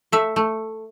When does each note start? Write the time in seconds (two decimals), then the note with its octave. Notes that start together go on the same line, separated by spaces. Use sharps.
0.12 A3 E5
0.36 A3